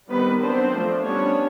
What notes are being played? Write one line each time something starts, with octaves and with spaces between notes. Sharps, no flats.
D#3 G3 B3 C4 B4
F#3 B3 C4 D4 C5
F3 A3 D4
G3 B3 C#4 D4 C#5